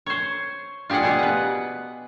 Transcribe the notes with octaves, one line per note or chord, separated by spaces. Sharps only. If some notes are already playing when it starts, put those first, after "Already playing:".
C5 C#5
F4 G4 G#4 D5 F#5
B2 B3 G4 G#4
B4 F#5